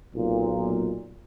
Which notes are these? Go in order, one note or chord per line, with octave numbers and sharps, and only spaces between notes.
B1 A#2